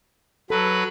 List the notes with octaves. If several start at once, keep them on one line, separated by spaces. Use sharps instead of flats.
F#3 A4 B4